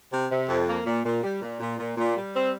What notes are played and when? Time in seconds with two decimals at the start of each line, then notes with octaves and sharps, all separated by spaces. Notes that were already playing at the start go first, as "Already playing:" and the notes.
0.11 C3
0.30 C3
0.49 F2
0.67 A#3
0.86 A#2
1.04 A#2
1.23 G3
1.42 A#2
1.60 A#2
1.79 A#2
1.97 A#2
2.16 G3
2.35 C4